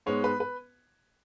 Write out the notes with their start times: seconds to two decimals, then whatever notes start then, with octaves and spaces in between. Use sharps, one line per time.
0.06 G#2 G#3 B3 C#5
0.24 B4
0.40 B4